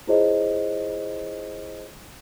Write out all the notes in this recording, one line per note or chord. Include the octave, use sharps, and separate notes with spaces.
E4 F4 G#4 C5 C#5 D#5